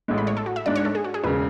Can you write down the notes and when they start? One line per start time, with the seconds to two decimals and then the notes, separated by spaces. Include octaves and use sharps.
0.08 A1 A2 G#3
0.18 B5
0.27 C#5
0.37 A4
0.46 F#4
0.56 E5
0.66 G#2 G#3 D4 D5
0.76 C#5
0.85 A4
0.95 G#4
1.04 F#4
1.14 G#4
1.24 E1 C#3 B4